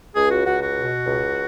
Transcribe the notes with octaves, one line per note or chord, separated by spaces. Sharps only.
C#2 G#4
F#4
C#2 F#4
F#4
B2
C#2